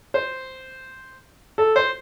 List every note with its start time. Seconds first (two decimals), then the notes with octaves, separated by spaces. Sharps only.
0.14 C5
1.58 A4
1.76 C5